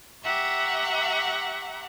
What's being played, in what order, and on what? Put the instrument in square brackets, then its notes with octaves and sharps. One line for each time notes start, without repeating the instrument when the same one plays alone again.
[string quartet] G4 E5 F#5 A#5 C#6